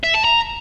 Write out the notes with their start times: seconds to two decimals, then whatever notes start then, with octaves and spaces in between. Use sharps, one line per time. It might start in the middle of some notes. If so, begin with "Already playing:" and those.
0.04 E5
0.14 A5
0.24 A#5